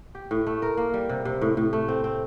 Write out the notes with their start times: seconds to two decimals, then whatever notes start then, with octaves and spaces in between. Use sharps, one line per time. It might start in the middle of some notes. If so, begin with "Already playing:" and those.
0.15 G4
0.31 A2
0.47 A3
0.62 A#4
0.77 A#3
0.94 G3
1.09 C3
1.25 C3
1.41 A2
1.57 A2
1.73 A3
1.88 C4
2.04 C4